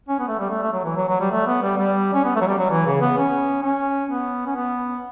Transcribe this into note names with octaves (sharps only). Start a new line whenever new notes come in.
C#4
B3
A3
G3
A3
A3
F#3
E3
F#3
F#3
G3
A3
B3
G3
G3
C#4
B3
A3
F#3
G3
F#3
E3
C#3
B3
C#4
C#4
B3
C#4
B3